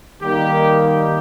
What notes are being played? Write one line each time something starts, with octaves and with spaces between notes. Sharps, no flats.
D#3 G3 A#3 D#4 G4
G4